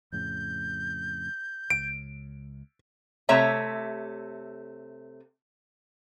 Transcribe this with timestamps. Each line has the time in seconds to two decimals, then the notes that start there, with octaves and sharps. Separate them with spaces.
0.12 F2 A2 C#3 G6
1.70 C#2 D7
3.29 C3 A3 C#5 E5 A#5